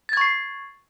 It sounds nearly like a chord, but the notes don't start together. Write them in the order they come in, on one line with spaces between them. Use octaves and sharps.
A6 G#6 C#6 C7